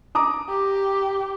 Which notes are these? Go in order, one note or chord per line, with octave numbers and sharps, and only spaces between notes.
A#5 D6 D#6
G4